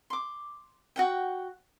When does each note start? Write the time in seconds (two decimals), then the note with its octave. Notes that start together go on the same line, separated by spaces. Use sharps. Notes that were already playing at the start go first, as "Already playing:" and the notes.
0.10 C6 D6
0.96 F#4 F#5 G5